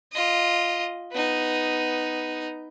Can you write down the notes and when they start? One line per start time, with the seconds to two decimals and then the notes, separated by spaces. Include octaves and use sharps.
0.12 F4 D#5
1.12 B3 D#4